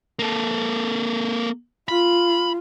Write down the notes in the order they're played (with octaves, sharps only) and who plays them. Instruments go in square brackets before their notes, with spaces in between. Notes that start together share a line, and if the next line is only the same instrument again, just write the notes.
[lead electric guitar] A#3 A4
[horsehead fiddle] F4 [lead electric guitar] B5